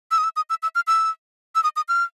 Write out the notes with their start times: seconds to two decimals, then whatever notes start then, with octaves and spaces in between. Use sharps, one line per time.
0.11 E6
0.18 D#6
0.24 E6
0.36 D#6
0.50 E6
0.63 E6
0.75 F6
0.87 E6
1.55 E6
1.64 D#6
1.76 D#6
1.89 F6